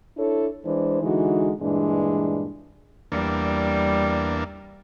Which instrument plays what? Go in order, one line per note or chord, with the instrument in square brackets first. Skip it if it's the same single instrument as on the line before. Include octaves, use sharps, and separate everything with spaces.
[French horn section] D4 E4 A4 C#5
E3 G#3 D4 C5
D3 E3 G#3 D#4 F#4
G2 A#2 E3 G#3 D4
[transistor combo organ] E2 A#3 D4 [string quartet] G3